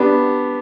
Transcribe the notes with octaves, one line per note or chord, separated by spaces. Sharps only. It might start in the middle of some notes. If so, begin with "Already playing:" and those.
Already playing: B3 D4 G4